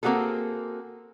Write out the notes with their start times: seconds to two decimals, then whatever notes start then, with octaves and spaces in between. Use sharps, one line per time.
0.03 A#3 C4 F#4 G#4 A4